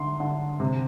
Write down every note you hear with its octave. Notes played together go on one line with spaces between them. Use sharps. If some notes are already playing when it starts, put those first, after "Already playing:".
Already playing: D3 C6
D3
C3